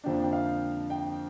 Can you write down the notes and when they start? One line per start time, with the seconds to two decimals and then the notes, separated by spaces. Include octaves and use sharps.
0.04 F2 D3 F3 A#3 D4 G5
0.22 G5
0.33 F5
0.90 G5